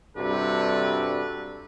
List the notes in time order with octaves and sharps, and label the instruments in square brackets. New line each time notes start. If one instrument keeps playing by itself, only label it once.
[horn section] G2 C3 F#4 A4 B4 D5